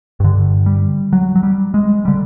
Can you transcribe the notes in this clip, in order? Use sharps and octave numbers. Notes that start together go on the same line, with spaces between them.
G2 D3
G3
F#3
F#3
G3
G#3
D3 G3